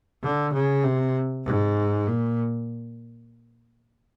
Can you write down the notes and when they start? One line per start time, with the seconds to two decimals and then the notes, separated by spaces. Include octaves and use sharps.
0.23 D3
0.53 C#3
0.84 C3
1.44 G#2
2.07 A#2